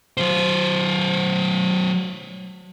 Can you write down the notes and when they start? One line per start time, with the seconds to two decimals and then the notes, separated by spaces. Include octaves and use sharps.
0.18 F#3 C5